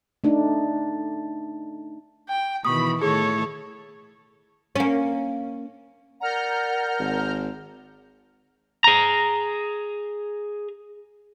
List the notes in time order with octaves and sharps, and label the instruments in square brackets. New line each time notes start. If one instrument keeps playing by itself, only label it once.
[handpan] A3 D4 D#4
[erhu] G5
[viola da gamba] B2 D#3 E3 [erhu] B5 [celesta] C#6 D#6
[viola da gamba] A2 D#3 A4 [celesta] G#4 [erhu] C#5
[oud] A#3 C#4
[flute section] A#4 D5 F#5 [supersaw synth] A#5 F6 G6
[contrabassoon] G#1
[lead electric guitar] G#4 A#5